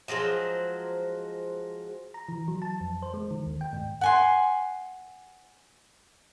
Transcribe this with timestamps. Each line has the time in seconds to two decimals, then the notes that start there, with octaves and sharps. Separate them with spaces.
0.08 F3 F#3 G#3 C5
2.14 A#5
2.28 E3
2.48 F#3
2.62 A5
2.80 F2
3.02 C5
3.14 G#3
3.31 D#3
3.46 D#2
3.61 G5
3.73 G#2
4.01 F#5 G#5 C6